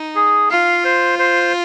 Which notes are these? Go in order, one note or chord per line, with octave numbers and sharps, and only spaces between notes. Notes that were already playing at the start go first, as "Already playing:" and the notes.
Already playing: D#4
G#4
F4 F5
C5
C5